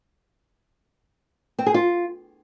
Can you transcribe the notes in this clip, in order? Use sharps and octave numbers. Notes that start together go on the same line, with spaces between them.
C4
G#4
F4